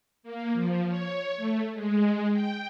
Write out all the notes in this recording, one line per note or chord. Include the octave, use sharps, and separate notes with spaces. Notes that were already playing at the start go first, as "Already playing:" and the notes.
A#3
F3
C#5
A3
G#3
G5